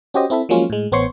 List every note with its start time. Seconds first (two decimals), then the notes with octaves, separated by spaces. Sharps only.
0.14 C#4 F#4 G4 C5 D#5
0.30 C4 E4 A4 E5
0.49 F3 F#3 G#3 A#3 C#4 F4
0.70 A2 G#3
0.92 A1 B3 C5 C#5 C6 C#6